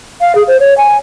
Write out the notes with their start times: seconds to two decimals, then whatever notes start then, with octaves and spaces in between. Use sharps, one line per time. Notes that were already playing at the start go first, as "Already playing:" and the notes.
0.21 F5
0.35 G#4
0.48 C5
0.60 C#5
0.78 G#5